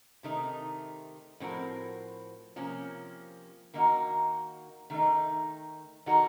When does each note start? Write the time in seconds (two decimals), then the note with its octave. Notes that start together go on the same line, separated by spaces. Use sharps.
0.23 C3 D#3 A3 D#4
1.40 A2 F3 C4 F#4 A#4
2.56 C3 F3 A#3 C#4
3.74 D#3 A#3 D#4 F#4
4.90 D#3 A3 D#4
6.06 D#3 A#3 D#4 F#4 A4